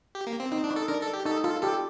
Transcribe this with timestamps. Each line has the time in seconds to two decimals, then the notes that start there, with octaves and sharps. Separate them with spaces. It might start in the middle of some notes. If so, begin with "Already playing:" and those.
0.15 G4
0.27 A#3
0.40 C4
0.52 C4 D#4
0.64 D4
0.71 D#4
0.76 A4
0.88 D4 A#4
1.01 A4
1.13 G4
1.25 D#4 A4
1.44 F4 A4
1.62 G4 A4